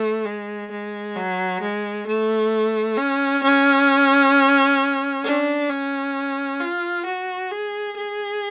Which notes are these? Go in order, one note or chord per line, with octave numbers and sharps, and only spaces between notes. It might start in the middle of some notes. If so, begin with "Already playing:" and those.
Already playing: A3
G#3
G#3
F#3
G#3
A3
C#4
C#4
D4
C#4
F4
F#4
G#4
G#4